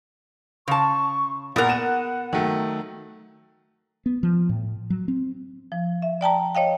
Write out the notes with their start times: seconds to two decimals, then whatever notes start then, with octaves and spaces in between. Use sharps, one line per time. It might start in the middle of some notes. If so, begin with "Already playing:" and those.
0.68 C#3 A5 C6 C#6
1.56 A#2 B3 G#4 A#4 F#5 F#6
1.69 D#7 E7
2.33 D#3 F#3 A3
4.06 B3
4.23 F3
4.49 A2
4.90 F#3
5.08 C4
5.72 F3
6.02 E5
6.21 D5 G5 A5 A#5
6.55 C#5 D#5 F5 G5